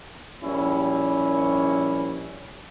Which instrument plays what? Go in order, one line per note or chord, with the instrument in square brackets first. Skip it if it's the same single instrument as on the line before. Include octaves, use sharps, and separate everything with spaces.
[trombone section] A#1 G3 C#4 E4